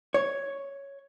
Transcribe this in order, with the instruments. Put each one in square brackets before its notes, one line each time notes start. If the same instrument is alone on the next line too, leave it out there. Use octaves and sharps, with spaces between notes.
[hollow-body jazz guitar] C#5